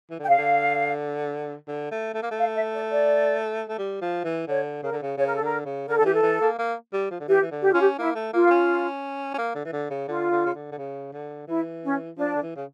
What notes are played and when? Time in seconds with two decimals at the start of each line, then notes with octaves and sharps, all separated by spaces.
0.11 E3
0.19 D3 G5
0.28 C#3 F5
0.38 D3
1.68 D3
1.91 A3
2.14 A3
2.23 A#3
2.31 A3
2.38 F5
2.55 E5
2.73 D5
2.91 D5
3.69 A3
3.78 G3
4.02 F3
4.24 E3
4.48 D3 C#5
4.83 C#3 A#4
4.92 D3
5.02 C#3
5.18 C#3 C#5
5.26 A#4
5.35 A4
5.41 D3 A#4
5.65 C#3
5.88 D3 A#4
5.96 A4
6.01 D3
6.05 E3 G4
6.13 A4
6.23 E3
6.41 A#3
6.59 A#3
6.93 G3
7.11 F3
7.20 D3
7.28 E3 G4
7.42 E3
7.52 D3
7.63 G4
7.72 C#4 F4
7.80 G4
7.98 A#3 E4
8.15 A3
8.33 A#3 F4
8.47 A#3
8.51 C#4
9.34 C#4
9.38 A#3
9.55 D3
9.65 E3
9.73 D3
9.91 C#3
10.08 D3 F4
10.31 D3
10.46 C#3
10.54 D3
10.72 D3
10.78 C#3
11.13 D3
11.48 E3 E4
11.84 C#4
12.18 F3 D4
12.36 D3
12.42 E3
12.56 C#3